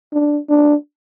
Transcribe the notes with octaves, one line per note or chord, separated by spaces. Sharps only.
D4
D4